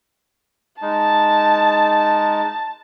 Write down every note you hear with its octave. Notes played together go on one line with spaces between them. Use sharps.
G#3 D#4 A5